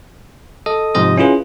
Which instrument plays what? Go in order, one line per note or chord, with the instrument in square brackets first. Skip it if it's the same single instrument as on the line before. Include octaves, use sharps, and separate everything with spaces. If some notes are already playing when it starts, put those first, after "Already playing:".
[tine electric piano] A4 D#5 D#6
G#2 C3 F3 D#5 D#6
C#4 E4 F4 G#4 B4